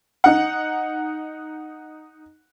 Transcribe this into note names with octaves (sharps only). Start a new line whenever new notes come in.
D#4 F#5